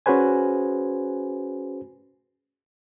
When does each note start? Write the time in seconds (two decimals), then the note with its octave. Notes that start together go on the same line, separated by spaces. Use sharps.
0.06 C#4 F#4 G#4 B4 C5 G#5